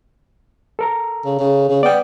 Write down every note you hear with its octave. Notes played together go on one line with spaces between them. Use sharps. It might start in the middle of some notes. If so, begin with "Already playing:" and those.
A4 A#4 A#5
C#3
C#3
C#3
B3 D5 G5